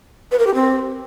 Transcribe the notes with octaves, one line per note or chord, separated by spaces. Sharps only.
B4
A#4
G4
C4